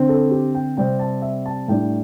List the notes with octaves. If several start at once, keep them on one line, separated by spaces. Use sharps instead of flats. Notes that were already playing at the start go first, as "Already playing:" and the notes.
Already playing: D3 C4
A4
G4
G5
C3 G3 C4 G5
A5
E5
A5
A2 G3 D4 G5